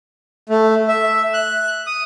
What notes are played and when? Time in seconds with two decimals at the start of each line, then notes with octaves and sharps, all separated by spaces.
0.49 A3
0.88 E5
1.34 F#6
1.87 D#6